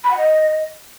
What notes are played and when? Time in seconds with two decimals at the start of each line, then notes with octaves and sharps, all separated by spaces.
0.04 B5
0.11 F#5
0.17 D#5